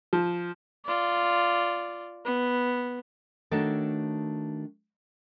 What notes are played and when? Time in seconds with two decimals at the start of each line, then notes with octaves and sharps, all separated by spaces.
0.13 F3
0.85 F4 D5
2.25 B3
3.51 D#3 A3 D4 F#4 A4 C#5